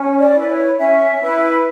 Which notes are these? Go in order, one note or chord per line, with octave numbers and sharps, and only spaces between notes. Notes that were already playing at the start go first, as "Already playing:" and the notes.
Already playing: C#4
D5
E4 B4
C#5
C#4 E5
E4 B4